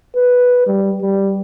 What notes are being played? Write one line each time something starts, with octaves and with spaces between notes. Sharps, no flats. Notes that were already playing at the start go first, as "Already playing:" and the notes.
B4
G3
G3